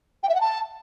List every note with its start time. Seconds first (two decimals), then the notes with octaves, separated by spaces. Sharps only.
0.23 G5
0.29 E5
0.35 F#5
0.41 A5